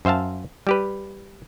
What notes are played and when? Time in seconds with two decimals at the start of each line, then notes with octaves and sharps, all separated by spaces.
0.05 F#2 C5 E5 F5 A5
0.67 G3 G4 B4